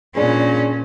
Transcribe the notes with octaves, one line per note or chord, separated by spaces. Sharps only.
A#2 C#4 D4 G#4 B4